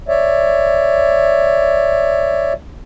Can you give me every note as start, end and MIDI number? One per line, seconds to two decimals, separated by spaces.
0.08 2.53 73
0.08 2.53 74
0.08 2.53 76